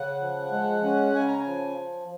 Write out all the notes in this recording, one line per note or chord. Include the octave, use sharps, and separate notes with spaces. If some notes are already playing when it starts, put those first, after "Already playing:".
Already playing: C#3 F#5
F3
G#3
C#4
C#3 G#5
A#5
G#5
F3